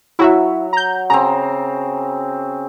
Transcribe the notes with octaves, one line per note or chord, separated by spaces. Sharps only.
F#3 E4 F#4 E5
A#5 G6
C#3 C4 A#5